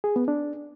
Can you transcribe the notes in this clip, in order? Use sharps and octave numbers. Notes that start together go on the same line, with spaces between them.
G#4
B3
D4